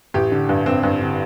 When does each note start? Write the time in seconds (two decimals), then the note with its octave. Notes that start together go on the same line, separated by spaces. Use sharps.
0.14 A1 G4
0.32 D3
0.49 G2
0.66 G2 C4
0.83 G2
1.01 D3